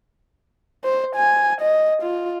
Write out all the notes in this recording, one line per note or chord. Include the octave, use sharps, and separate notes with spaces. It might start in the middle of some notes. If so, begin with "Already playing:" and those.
C5
G#5
D#5
F4